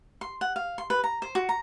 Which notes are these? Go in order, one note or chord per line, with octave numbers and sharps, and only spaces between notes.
C6
F#5
F5
C6
B4
A#5
C5
F#4
A#5